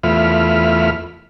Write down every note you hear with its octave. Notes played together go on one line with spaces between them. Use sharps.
E2 A3 F4 E5 B5 F6